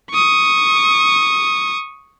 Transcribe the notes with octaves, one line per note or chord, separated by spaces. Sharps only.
C#6 D#6